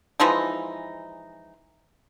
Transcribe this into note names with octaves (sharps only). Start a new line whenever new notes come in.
E3 F3 G#3 D#4